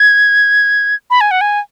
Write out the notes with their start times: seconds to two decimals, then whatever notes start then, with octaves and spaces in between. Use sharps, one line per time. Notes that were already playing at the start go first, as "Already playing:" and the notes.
Already playing: G#6
1.10 B5
1.21 G#5
1.31 F#5
1.41 G#5